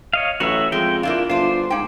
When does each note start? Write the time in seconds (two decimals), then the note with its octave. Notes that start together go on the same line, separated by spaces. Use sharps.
0.13 C#5 D#5 F5
0.40 A1 F#3 F#4 C#5 E5
0.72 F2 G#3 G5
1.03 A#3 D4 E4 F4
1.29 G1 D4 F4 C5
1.70 G#2 A#3 G5